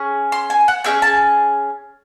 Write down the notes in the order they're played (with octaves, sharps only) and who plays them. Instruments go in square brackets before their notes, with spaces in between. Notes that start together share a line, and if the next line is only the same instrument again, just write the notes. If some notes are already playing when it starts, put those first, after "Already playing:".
Already playing: [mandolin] C#4 G#4
C6
G#5
F#5
C#4 E4 G#4 G5
A5